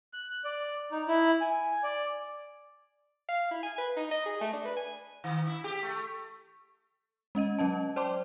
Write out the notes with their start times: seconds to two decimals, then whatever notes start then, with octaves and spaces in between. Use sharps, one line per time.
0.13 F#6
0.45 D5
0.92 D#4
1.08 E4
1.41 G#5
1.83 D5
3.29 F5
3.51 E4
3.63 G#5
3.78 B4
3.97 D#4
4.11 D#5
4.26 G#4
4.41 A3
4.53 D4
4.65 B4
4.76 G#5
5.24 D#3
5.47 E4
5.64 G4
5.83 A3
7.35 G#3 C#4 D#5 D#7
7.59 F#3 C#4 D#5 A5
7.96 C5 D5 G5 A5 C6 D6